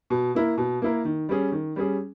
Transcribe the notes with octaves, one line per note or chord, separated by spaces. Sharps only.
B2
A#3 E4 A#4
B2
A#3 E4 A#4
D#3
G3 C#4 G#4
D#3
G3 C#4 G#4